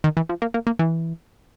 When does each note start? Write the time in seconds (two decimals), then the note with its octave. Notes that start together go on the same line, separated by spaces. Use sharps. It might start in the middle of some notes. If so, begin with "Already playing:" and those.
0.04 D#3
0.17 E3
0.29 F3
0.42 A#3
0.54 A#3
0.67 A#3
0.79 E3